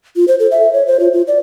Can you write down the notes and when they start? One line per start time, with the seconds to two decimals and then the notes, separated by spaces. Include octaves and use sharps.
0.16 F4
0.28 C5
0.40 A4
0.51 E5
0.73 C#5
0.87 C5
1.00 F4
1.13 F4
1.28 D5